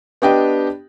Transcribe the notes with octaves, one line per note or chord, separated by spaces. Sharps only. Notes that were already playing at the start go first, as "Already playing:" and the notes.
B3 D4 G4 D#5 G5